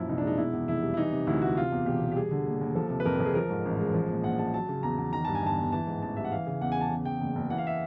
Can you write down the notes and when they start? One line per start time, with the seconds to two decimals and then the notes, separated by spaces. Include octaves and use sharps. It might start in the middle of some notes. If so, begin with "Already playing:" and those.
Already playing: F#2 A#2 F3 E4
0.09 C2 D#4
0.18 D4
0.23 G#3 D#4
0.38 B2 E4
0.53 E2
0.68 F1 E4
0.83 G3
0.94 E4
0.97 E3 D#4
1.12 C3
1.27 D2 E4
1.42 D2 F#4
1.57 C3 F4
1.72 E2
1.86 E1 G4
2.01 E1
2.12 G4
2.16 G3 G#4
2.31 D3
2.46 D#2
2.61 D#2
2.75 F3 A4
2.90 C3
3.00 B4
3.05 F2 A#4
3.15 A4
3.20 F2
3.25 G#4
3.35 F3 A#4
3.50 G#2
3.65 A1
3.80 G#3
3.94 F3
4.09 A#2
4.24 A#1 F#5
4.39 G#3 A5
4.54 F#3 A5
4.69 C#3
4.83 E2 A#5
4.98 E2
5.13 D#3 A#5
5.25 G2 A5
5.35 G#5
5.43 G1 A5
5.58 G1
5.72 E3 A5
5.87 G#2
6.02 A1 A5
6.17 G3 E5
6.25 F#5
6.32 E3 F5
6.47 C#3
6.61 E2 F#5
6.72 G#5
6.76 E2 A5
6.91 C#3
7.05 E2 G5
7.21 F#1
7.35 F#1
7.50 E3 F#5
7.58 F5
7.67 E5